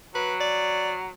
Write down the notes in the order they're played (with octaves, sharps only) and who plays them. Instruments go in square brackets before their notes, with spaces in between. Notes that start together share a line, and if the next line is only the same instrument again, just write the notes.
[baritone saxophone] F#3 [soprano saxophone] B4
[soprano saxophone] D5